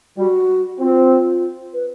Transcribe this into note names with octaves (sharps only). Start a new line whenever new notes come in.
G3 F#4
C4 F4
B4